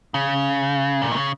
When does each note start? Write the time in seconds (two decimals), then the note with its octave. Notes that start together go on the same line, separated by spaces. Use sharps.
0.14 C#3
1.02 A#2
1.11 D#3
1.16 C#3